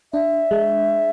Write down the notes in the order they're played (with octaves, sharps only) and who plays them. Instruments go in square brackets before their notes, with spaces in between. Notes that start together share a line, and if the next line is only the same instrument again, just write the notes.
[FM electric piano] D4 [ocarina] E5
[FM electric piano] G#3